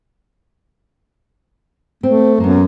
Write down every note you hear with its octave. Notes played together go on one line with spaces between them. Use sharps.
A3 C4
F#2 A#3 B3